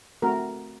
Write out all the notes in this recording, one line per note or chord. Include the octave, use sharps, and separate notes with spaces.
A3 C4 F#4 A#4